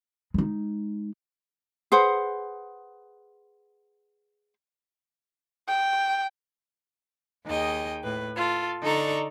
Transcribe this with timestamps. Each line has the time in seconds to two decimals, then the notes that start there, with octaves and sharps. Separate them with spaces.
0.34 G#3 D#4
1.92 G#4 B4 C5 F#5
5.68 G5
7.46 D#2 D#4 G#4 D#5 G5
8.04 A2 B4
8.35 F4 A4
8.83 D3 D#4 A4 D5 A#5 C#6